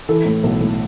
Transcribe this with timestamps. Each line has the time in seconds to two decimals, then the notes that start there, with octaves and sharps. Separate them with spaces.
0.09 E3 A4
0.26 A2
0.44 B1
0.61 A2